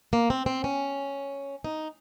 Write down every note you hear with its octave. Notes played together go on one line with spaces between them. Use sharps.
A#3
C4
C4
C#4
D#4